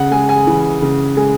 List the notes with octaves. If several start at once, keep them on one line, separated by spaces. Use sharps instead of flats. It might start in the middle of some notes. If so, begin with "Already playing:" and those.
Already playing: C#3 F#5
G#3 G#5
G#5
E3
C#3
G#3 G#5